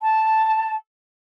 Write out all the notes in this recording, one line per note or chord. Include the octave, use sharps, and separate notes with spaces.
A5